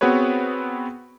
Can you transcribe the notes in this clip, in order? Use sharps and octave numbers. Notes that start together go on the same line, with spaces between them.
B3 C4 F#4 G#4 B4 C#5